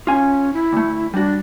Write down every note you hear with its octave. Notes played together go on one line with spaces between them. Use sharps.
C#4 F4 G#5
E4
D2 A3
G3 D4 F#4